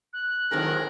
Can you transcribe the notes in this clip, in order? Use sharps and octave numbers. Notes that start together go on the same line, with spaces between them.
F#6
G#1 A2 D#3 F#3 C4 G#4 A#4